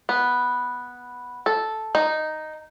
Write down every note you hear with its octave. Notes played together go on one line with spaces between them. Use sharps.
B3
A4
D#4